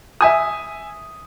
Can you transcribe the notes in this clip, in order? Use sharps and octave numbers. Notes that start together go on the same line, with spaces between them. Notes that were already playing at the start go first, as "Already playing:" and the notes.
E5 G#5 D#6